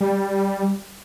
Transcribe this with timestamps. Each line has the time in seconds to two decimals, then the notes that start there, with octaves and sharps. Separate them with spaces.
0.01 G3